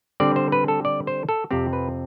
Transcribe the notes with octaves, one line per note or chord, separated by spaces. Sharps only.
D3 G3 C4 D5
C5
B4
A4
D5
C5
A4
F2 C3 F3 C4 G4
B4